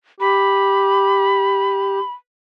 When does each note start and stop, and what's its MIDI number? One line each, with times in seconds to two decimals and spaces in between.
0.20 1.99 67
0.20 2.11 83